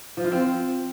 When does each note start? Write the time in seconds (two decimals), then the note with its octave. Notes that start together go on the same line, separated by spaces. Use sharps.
0.17 F3
0.24 F4
0.32 C4